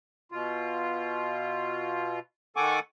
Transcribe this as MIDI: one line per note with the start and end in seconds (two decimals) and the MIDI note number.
0.32 2.20 47
0.32 2.20 65
2.56 2.80 51
2.56 2.80 69
2.56 2.80 78
2.56 2.80 80
2.56 2.80 85
2.56 2.80 86